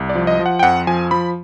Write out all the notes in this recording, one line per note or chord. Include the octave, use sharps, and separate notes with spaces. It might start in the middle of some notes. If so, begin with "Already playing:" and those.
Already playing: C2
D5
F3
D#5
F3
F#5
G5
F2 F#5
F3 G#5
F3 B5